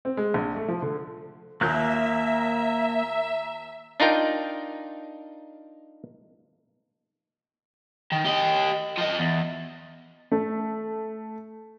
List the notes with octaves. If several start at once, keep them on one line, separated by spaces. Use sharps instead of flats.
C4
G#3
A#1
A3
F3
D3
D#2 A#2 A#3 E5 A#5 F#6 G6
D4 D#4 F4 A#4 G5
D#3
G4 D#5
F3 D#5
E2
A3